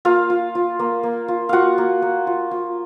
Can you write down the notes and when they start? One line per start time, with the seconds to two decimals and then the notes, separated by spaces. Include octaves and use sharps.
0.05 A#3 F4 F5
0.30 F4
0.55 F4
0.79 A#3
1.03 A#3
1.28 F4
1.49 F4 F#4 F5 F#5
1.78 A#3
2.02 A#3
2.27 F4
2.51 F4